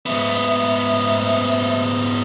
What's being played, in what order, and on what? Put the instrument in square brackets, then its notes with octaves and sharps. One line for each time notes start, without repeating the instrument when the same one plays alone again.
[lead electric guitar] G#2 B3 [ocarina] E5